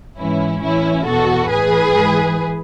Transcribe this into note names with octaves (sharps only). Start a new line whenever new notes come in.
G#2 E3 C#4 E4
A2 E3 C#4 E4
E2 B2 F#4 A4
A2 E3 G#4 B4
G#2 E3